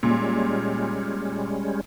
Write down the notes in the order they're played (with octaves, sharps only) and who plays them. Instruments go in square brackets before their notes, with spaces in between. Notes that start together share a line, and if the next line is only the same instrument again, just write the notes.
[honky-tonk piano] A#2 [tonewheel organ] G3 G#3 C#4